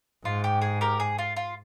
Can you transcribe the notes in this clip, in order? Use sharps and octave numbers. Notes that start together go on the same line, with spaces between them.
G#2 F4
G4
G#4
G4 A#4
G#4
F4
F4